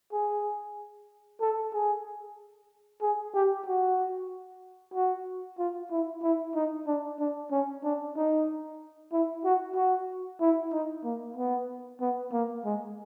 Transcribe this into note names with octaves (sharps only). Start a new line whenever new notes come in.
G#4
A4
G#4
G#4
G4
F#4
F#4
F4
E4
E4
D#4
D4
D4
C#4
D4
D#4
E4
F#4
F#4
E4
D#4
A#3
B3
B3
A#3
G#3